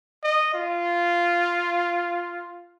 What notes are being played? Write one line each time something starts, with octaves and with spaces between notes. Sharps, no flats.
D#5
F4